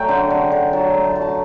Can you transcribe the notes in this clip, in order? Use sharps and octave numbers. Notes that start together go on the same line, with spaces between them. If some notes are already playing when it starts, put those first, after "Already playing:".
Already playing: F#3 A3 D5 G5 A5
D3
D3
D3
F#3 A5
A5
A3
A5
F#3
A5